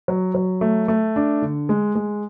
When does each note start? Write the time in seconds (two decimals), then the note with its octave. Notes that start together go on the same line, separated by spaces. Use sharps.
0.08 F#3
0.35 F#3
0.61 A3
0.88 A3
1.16 D4
1.42 D3
1.69 G#3
1.95 G#3